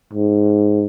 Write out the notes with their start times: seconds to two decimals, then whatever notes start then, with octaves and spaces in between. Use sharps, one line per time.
0.13 G#2